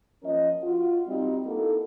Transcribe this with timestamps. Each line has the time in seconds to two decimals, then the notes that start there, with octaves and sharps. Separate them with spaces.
0.23 F3 A#3 C#4 A#4 D#5
0.62 F4 F#4
1.07 G3 C4 D#4
1.46 A#3 D#4 E4 F#4 A4